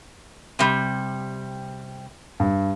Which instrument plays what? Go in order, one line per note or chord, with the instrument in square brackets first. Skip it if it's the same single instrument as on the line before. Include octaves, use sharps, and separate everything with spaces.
[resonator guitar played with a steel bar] C3 G3
[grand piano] G2